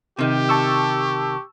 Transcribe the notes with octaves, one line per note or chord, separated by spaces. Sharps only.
C3 D#3 G4
A5 C#6 E6